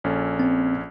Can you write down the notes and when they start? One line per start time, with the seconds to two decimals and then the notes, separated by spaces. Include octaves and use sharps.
0.04 A#1 C#4 A4
0.40 C4